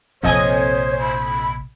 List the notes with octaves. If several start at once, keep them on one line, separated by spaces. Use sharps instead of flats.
A#1 F2 C3 C5 C#5 D#5 G#5
B5